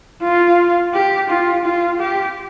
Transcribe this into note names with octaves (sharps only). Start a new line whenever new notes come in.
F4
G4
F4
F4
G4